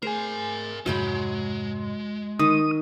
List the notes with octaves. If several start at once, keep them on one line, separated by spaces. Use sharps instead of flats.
A3 G#4 A#4 C5 G#5
F2 G#2 C3 F#3 G#3 G5 B5
D#3 C#6 D#6